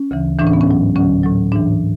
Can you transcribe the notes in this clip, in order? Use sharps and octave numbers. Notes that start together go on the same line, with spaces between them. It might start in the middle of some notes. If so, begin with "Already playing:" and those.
Already playing: C#4
D2 C#3 E3
A2 E3 D4
C#4
B3
C#4
G#2 F#3
D2 D3 F#3 C#4
A2 F#3
G#2 E3 D4